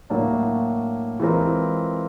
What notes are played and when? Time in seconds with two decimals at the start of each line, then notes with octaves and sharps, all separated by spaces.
0.10 A2 F#3 A#3 D4
1.20 E3 G#3 C4 F4 A#4